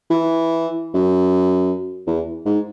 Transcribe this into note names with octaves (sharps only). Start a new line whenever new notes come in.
E3
F#2
E2
G#2